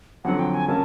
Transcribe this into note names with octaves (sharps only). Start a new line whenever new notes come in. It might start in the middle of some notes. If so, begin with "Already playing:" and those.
F2 D3 F#3 F#5
G5
G#5
C#3 F#3 A#3 C#4 A5